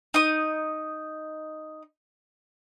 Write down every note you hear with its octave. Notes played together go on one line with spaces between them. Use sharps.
D#4 D#6